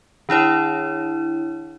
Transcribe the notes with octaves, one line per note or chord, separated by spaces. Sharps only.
D#3 D4 E4 C#5